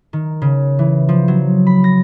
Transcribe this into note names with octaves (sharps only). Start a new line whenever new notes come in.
D#3
C#3
E3
F3
F#3
B5
A#6